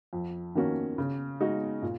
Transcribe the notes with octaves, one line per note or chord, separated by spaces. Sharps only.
F2
D#3 A#3 C#4 F#4
C#3
G#3 D#4 F#4
A#2